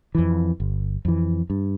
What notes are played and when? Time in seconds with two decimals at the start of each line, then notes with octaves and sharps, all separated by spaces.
0.15 F2 E3
0.60 G1
1.05 F2 E3
1.50 G2